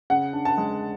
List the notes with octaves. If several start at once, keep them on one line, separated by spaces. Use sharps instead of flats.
C#3 F#5
D4
A5
G#3